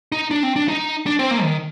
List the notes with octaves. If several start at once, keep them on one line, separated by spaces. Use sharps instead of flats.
D#4
D4
C4
D4
D#4
D4
C4
A#3
D#3